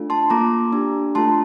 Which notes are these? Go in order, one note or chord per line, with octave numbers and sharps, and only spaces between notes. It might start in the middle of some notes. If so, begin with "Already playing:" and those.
Already playing: A3 D4 F4 A4
A5 C6
A#3 F4 A4 A#5 D6
D4 G4
A3 D4 F4 A4 A5 C6